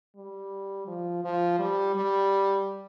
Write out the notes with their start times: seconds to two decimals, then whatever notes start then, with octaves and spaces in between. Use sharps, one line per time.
0.16 G3
0.87 F3
1.24 F3
1.59 G3
1.95 G3